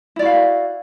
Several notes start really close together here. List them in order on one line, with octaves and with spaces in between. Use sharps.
E4 D5 F#4 F5